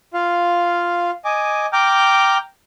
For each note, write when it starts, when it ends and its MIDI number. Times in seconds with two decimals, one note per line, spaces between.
0.14 1.11 65
0.14 1.11 77
1.25 1.66 75
1.25 1.66 80
1.25 1.66 86
1.73 2.37 79
1.73 2.37 82
1.73 2.37 86
1.73 2.37 89
1.73 2.37 91